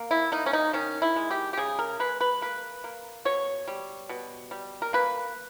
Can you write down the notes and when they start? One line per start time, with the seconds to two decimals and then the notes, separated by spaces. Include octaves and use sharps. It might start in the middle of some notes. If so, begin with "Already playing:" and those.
Already playing: A#3
0.11 E4
0.32 A#3 D#4
0.46 C#4
0.53 D#4
0.73 D#3 C#4
1.02 E4
1.16 G#3
1.31 G4
1.53 G4
1.57 C#3 G#4
1.79 A#4
2.00 G#3 B4
2.21 B4
2.42 A#3 B4
2.84 A#3
3.25 B2 C#5
3.68 G3
4.09 B2
4.51 G3
4.82 A#4
4.93 A#3 B4